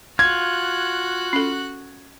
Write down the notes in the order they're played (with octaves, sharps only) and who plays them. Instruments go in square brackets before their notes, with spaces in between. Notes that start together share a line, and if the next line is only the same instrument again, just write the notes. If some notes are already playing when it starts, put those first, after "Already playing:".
[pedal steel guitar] F4 [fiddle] F#4 F#6 [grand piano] G#6
[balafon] C#4 A4